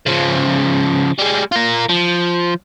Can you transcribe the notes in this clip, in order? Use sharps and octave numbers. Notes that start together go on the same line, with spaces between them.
C#3 F3
G3 G#3
F4 A#4
F3